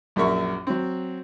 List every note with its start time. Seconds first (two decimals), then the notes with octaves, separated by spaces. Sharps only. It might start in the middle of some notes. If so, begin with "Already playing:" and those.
0.16 A#1 F#2 A#4 E5 C#6
0.67 F#3 C4